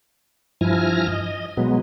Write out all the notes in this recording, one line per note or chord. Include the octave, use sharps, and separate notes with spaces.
G2 F3 E4 G#5 F6 A#6
D#5
B2 F#3 G#3 B3